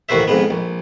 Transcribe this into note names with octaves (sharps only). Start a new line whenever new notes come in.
A1 D#2 D#3 F#4 C5 E5
F2 G#2 B3
A#1